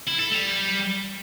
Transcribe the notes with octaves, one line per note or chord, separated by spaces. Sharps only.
E4
A4
G3